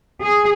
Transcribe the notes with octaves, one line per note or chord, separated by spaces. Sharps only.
G#4